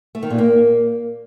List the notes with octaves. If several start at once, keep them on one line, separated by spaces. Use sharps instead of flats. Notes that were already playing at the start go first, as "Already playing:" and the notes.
A3
D#3
A#2
A#3